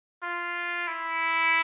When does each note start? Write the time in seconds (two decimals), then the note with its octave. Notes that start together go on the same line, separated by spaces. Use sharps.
0.23 F4
0.88 E4